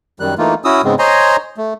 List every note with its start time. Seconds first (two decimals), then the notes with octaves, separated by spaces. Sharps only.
0.20 F#2 D#3 G3 F#6
0.38 E3 A3 A#3 D#4 F4
0.65 C#4 E4 F#4 D#6 E6
0.84 G#2 C#3 G#3 B3 C4
0.99 C5 C#5 D#5 G#5 A#5 C6
1.57 A3